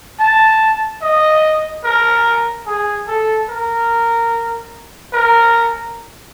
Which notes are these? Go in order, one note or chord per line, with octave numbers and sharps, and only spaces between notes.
A5
D#5
A#4
G#4
A4
A#4
A#4